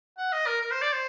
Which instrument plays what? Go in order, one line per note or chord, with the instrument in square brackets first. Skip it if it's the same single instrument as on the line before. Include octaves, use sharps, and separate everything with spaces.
[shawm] F#5
D#5
A#4
A#4
C5
D5
C5